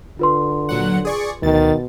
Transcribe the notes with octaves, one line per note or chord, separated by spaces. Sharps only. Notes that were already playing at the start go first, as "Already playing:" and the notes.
D3 F4 B4 C6
A#2 F#3 F#5
G#4 D5 C#6
D2 B2 D#3 A6